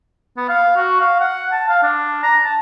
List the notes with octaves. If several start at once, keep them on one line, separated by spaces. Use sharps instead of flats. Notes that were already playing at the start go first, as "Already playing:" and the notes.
B3
F5
F#4
F5
F#5
A5
F5
D4
A#5
A5